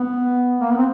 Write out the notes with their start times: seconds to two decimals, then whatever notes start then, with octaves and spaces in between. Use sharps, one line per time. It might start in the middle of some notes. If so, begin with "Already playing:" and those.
Already playing: B3
0.61 A#3
0.69 B3
0.78 C4